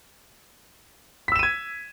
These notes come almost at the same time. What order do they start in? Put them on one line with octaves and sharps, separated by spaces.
B6 E6 E7 D#7 G#6